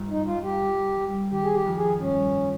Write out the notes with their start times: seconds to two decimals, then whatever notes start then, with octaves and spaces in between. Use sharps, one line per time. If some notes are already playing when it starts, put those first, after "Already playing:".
Already playing: G1 G2
0.10 D#4
0.26 G1 F4
0.43 G4
0.61 G1
0.97 G3
1.31 D#3 G4
1.43 G#4
1.54 G4
1.66 F2
1.77 G#4
2.00 G2 C#4